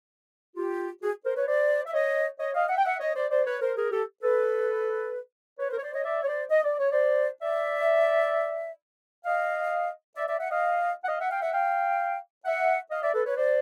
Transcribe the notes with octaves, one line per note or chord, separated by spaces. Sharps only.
F4 G4
F#4 G#4
A#4 C5
B4 C#5
C5 D5
E5
C#5 D#5
C#5 D#5
D#5 F5
E5 F#5
G5
E5 F#5
C#5 D#5
C5 D5
C5 D5
B4 C#5
A#4 C5
G#4 A#4
G4 A4
A4 B4
B4 C#5
A#4 C5
C#5
C5 D5
C#5 D#5
D5 E5
C#5
C5 D5
D#5
D5
C#5
C5 D5
D5 E5
D#5 F5
D5 E5
D5 E5
E5 F#5
D#5 F5
F#5
D#5 F5
E5 F#5
F5 G5
E5 F#5
F5 G5
E5 F#5
D#5 F5
D5 E5
A4 B4
B4 C#5
C5 D5